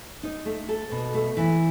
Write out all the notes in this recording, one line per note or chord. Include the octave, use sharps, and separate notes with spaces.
D#4
A3
A4
B2
A3
E3